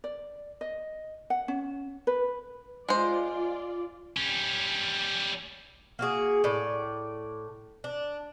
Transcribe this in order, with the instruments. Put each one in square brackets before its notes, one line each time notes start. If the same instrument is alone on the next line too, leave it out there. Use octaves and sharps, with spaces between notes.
[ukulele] D5
D#5
F#5
C#4
B4
[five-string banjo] G#3 C5 [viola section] F4 D5
[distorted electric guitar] G3 C#4
[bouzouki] A#3 F#4 G#4
A2 D5
D4